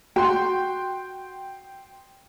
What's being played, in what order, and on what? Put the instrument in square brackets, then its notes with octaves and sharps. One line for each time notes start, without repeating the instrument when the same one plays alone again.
[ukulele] F#4 [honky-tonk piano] G5 C6